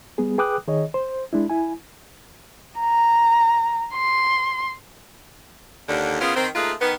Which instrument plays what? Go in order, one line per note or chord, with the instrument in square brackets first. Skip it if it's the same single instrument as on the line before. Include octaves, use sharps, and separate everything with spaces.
[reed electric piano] G3 B3 G#4
G#4 B4 G5 D6 D#6 F#6
D#3 G#4 C#5 D#5
C5
G#3 D4 E4
E4 G#5
[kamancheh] A#5
C6
[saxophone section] D#2 D3
C#3 B3 C#4 F4 G#4 A#4
D#3 C4
A3 A#3 D#4 F4 G#4 B4
D#3 B3